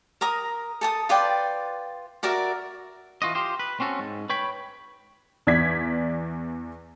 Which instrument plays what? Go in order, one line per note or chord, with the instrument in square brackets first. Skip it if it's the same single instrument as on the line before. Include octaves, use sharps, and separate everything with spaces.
[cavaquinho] A#4 A#5 D#6
A4 A5 D#6
F4 B4 D5 G5
F#4 A#4 D5 E5
[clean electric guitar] E3 F4 F#4 D#5
F4 G4 C5
B4
C4 C#4 F#4 A4
G#2
B4 C#5 G5 B5
[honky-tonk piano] E2 D5 G#6 B6